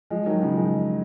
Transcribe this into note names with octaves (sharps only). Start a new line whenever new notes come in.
F3 G#3
D#3 F#3
C#3 F3
F3 G#3